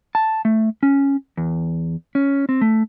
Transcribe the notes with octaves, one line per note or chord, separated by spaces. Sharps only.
A5
A3
C#4
E2
C#4
C4
A3